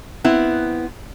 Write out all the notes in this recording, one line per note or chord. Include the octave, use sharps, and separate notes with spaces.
B3 C4 E4